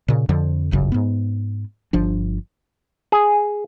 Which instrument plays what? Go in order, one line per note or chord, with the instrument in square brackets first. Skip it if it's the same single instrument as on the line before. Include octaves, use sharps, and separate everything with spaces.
[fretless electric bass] A#2 C#3
F2 D3 F3
D1 G1 F#2 C#3
G#2 B3
G1 F3 D4
[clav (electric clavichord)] G#4